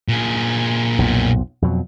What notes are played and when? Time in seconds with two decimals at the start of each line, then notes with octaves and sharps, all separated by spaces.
0.08 A#2 G#4
0.99 B1 F2
1.62 F2 B2 F#3